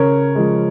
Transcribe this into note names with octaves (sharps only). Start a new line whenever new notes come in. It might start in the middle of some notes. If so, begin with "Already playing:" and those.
Already playing: C#3 A#4 C#5
F3 G#3